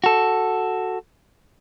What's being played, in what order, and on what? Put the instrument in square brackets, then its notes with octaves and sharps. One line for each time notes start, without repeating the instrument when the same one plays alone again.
[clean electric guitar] F#4 A4